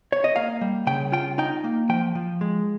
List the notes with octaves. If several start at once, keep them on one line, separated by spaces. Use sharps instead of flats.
C#5
D#5
A#3 F5
G3
C#3 G5
F4 G5
D#4 G5
A#3
F3 G5
F3
G#3